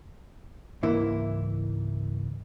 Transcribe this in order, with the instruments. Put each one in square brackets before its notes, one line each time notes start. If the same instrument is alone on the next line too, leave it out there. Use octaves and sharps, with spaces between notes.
[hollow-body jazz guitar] C#2 G#2 E3 A#3 E4